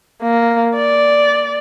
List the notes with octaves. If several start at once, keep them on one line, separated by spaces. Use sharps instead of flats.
A#3
D5